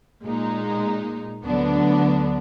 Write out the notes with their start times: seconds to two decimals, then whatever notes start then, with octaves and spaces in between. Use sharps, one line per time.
0.24 A#2 G#3 D#4
1.46 D2 D3 F#3 B3 D4